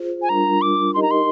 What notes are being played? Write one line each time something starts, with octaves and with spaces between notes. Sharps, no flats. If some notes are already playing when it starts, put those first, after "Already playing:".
Already playing: F4 G#4 C5
G#5
G3 D4 F4 A#4 A#5
D6
D#4 G4 A#4 D#5 C6
A#5
C6